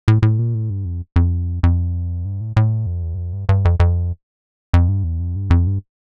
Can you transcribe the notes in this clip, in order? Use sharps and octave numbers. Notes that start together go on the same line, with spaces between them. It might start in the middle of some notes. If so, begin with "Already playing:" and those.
A2
A2
A#2
A2
G2
F2
F2
F2
G2
A2
A2
F2
E2
G2
F2
G2
G2
F2
F2
F2
G2
E2
F2
G2
F2
G2